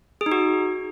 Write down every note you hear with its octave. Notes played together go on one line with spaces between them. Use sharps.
G#4
D#4
F#4